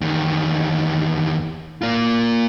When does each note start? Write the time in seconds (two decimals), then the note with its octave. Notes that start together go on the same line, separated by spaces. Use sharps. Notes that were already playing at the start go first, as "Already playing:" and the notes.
0.01 E2 D#3
1.82 A#3 F4